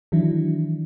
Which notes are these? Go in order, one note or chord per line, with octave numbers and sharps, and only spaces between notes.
D#3 E3 F#3 D4 E4